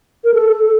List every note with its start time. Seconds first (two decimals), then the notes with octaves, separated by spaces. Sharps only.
0.24 A#4
0.34 A4
0.52 A4
0.64 A4